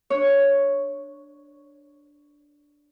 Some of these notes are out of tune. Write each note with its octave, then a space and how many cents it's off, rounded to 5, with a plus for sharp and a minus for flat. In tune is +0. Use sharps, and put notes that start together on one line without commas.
D4 +0 C#5 +0